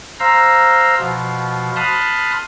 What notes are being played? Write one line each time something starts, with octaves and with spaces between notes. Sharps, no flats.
C5 F5 A#5 E6
B2 F3
A5 B5 C6 D#6 F6 F#6